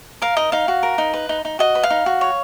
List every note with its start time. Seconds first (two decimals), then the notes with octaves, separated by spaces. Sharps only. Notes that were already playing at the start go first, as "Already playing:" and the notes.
0.22 A#4 F5
0.37 D#4 D#5
0.52 D#4 F5
0.68 F#4
0.83 A#4
0.98 D#4
1.13 B4
1.29 D#4
1.45 D#4
1.59 F#4 D#5
1.75 B4
1.83 F5
1.90 D#4
2.06 F#4
2.21 C#5